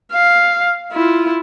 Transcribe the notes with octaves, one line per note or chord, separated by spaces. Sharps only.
F5
E4 F4